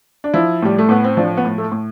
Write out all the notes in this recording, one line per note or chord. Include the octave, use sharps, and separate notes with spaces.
D4
F3 E4
A2 G3
A3
A2 B3
C4
F3 D4
B3
A2
A3
A2